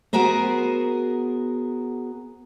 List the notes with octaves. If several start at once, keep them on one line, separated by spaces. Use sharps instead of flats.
B3 F#4 G#4 A#4 C5